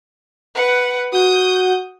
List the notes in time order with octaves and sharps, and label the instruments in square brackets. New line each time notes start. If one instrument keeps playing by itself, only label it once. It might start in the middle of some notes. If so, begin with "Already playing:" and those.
[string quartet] B4 F#5
[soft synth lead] F#4 [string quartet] D#6 G6